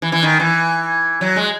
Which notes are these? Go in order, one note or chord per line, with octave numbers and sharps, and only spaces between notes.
E3
E3
D#3
E3
F#3
G#3